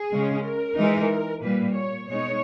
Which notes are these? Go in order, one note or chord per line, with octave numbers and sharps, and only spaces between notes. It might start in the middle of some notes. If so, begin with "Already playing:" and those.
Already playing: G#4
C#3 G#3 C#4
A#4
E3 G#3 D#4
A#2 G3 A#3 B4
C#5
B2 G#3 D#4 C#5